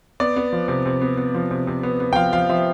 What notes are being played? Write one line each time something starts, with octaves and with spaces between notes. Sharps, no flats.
B3 D5
B3
F3
C3
C3
B3
B3
F3
C3
C3
B3
B3
G5
F3 F5
F3 F5
F3 E5